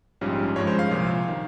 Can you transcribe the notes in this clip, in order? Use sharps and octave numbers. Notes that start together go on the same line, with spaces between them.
A#1 G#2 G3 C#4 F4
G2 F3 G#3 C#4 C#5
C5
F5
C2 A#2 F3
D#3